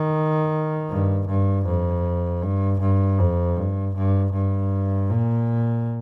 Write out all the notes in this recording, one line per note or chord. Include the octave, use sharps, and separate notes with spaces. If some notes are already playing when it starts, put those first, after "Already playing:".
Already playing: D#3
G2
G2
F2
G2
G2
F2
G2
G2
G2
A#2